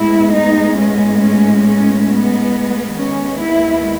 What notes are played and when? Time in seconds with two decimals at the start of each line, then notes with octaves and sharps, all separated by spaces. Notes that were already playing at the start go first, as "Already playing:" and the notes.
Already playing: A2 G#3 B3 E4
0.32 D#4
0.75 C#4
1.20 C#4
1.63 C#4
2.07 B3
2.95 D#2 D#3 G#3 B3 C#4
3.39 E4